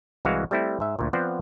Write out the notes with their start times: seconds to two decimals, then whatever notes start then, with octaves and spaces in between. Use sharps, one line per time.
0.25 C2 E3 G#3 F#4 F5
0.51 G3 A3 C4 E4
0.80 G#2 E5
0.99 D2 A#2
1.13 F3 B3 C4 C5 D5 F#5